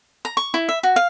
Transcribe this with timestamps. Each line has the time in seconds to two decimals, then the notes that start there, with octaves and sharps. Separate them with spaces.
0.25 A#5
0.37 C#6
0.54 E4
0.69 E5
0.83 F#4
0.96 F5